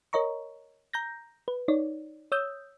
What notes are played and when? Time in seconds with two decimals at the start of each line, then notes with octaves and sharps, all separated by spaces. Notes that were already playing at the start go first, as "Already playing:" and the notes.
0.13 A#4 C#5 D#5 A#5 C#6
0.93 A#5 G6 A#6
1.48 B4
1.68 D#4 C#5 D5
2.32 C#5 D#6 E6 G6